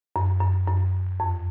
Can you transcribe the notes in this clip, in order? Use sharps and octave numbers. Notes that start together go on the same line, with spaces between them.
F#2
F#2
F#2
F2